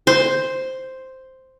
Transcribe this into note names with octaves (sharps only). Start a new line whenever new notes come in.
C5